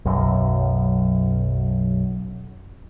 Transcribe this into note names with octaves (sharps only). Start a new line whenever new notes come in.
B1 F#2